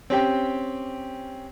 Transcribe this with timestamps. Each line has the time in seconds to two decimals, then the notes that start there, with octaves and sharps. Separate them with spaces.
0.10 C4 C#4 G4 G5